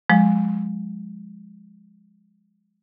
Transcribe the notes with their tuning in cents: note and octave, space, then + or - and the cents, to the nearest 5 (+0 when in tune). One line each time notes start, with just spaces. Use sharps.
F3 +30 G#3 +0